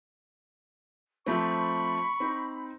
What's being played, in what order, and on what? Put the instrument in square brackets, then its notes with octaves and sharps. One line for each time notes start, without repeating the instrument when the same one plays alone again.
[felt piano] F3 A3 C4 [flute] B5 [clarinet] C#6
[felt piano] C4 D#4